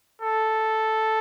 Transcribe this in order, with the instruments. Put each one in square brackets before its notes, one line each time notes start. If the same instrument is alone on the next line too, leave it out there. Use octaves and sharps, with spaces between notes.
[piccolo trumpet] A4